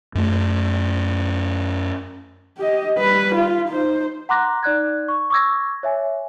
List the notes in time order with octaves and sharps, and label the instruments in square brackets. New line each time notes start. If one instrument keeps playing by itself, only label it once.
[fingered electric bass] F#2 A3
[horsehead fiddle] G4 D#5
G3 B4
F4
D#4 C5
[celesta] F#5 A#5 C6 D6 F#6 A#6
D#4 D5 F#6 G#6
C#6
C#6 D6 E6 G#6 A#6
C#5 E5 G#5